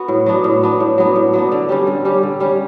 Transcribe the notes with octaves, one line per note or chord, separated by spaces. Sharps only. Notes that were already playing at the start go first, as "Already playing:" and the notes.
Already playing: B3 F#4
A2
F#3 B3 D4
A2
F#3 B3 D4
A2
F#3 B3 D4
A2
F#3 B3 D4
D3
G3 C#4 G4
D3
G3 C#4 G4
D3
G3 C#4 G4